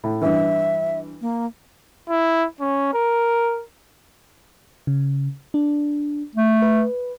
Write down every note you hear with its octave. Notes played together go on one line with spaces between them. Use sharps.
A2
G2 E3 E5
A#3
E4
C#4
A#4
C#3
D4
A3
B4